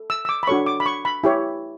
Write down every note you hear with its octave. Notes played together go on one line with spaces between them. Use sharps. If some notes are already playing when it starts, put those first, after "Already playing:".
Already playing: A4
E6
E6
D6
B5
D4 F#4 A4 C#5 C#6
D6
B5
C#6
B5
E4 G4 C#5